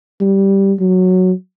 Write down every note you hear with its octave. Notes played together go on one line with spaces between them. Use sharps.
G3
F#3